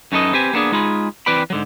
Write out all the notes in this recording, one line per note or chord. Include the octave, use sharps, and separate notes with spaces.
F#2 C#4 D#4 A4 B4 D#5
C4 G4 B4 G#5
A#3 B3 D4 G#4
G#3 D#4 F4 G#4 B5
E3 C4 B4 D5 G5 B5
G#2 D3 F#3